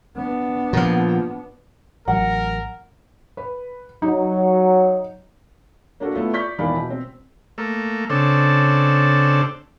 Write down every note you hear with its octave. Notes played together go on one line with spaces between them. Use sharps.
B3 D4
A#2 F3
A1 F#3 A#4 F#5
B4
F#3 D#4
A#3 D4 F#4 A4
A3 B3 E4 F4
D5 C#6 G6 B6
E1 D#3 E3 D5 F5 B5
B2
C4
A3 A#3
C#3 C4 D4 A4